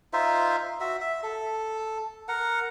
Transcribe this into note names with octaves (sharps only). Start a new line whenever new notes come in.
D#4 F4 C5 E5
F#4 E5
E5
A4
A#4 F#5